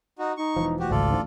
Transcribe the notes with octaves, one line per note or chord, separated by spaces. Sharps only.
D#4 F#4
D#4 C#6
E1 E3 F3
D2 F#4 G4
G#1 C#2 F4 A4 D5
A1 D2 G#2